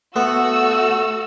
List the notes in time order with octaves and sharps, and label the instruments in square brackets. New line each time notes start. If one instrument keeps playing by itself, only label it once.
[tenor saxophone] A3 [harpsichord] B3 [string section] F#4 [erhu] E6